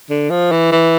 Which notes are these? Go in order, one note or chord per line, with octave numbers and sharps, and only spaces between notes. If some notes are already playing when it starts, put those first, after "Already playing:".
D3
F3
E3
E3